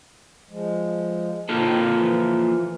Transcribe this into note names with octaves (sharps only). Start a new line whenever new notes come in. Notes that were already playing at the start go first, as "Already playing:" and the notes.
F3 G#3
D#3 A#3 C4 F4 A4
E3 F3